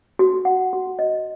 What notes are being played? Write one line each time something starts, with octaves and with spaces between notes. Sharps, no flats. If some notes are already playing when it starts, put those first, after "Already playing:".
F#4
F#5
F#4
D#5